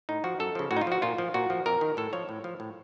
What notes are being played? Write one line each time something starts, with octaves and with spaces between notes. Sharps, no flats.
A2 D#4
F3 F#4
F#2 A4
C#3 F3
A2 F#4
D#4
F4
F3 F#4
A#2 F4
F3
A#2 F#4
F3
F2 A#4
D#3
A2 A4
F3 C#5
A2
F3
A2